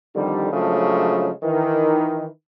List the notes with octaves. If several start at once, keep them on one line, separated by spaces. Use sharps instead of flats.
F2 D3 D#3 G3
C#3 F3 F#3 G#3 A3 D4
D#3 E3